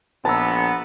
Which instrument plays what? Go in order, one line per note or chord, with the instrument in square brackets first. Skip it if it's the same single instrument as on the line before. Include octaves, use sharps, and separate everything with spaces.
[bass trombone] A#1 [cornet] B3 [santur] A5 A#5 E6